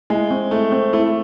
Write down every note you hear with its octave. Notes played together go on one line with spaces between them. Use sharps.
G#3 E4
C4
A3 E4
C4
A3 E4